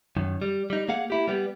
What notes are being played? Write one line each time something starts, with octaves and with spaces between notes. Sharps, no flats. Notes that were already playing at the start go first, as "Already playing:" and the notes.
F#2 D#3
G3
G3 D#4
A#3 G#4 F5 F#5
A#3 E4 G4
G3 B3 G4